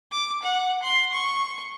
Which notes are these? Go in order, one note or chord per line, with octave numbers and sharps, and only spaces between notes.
D6
F#5
C6
C#6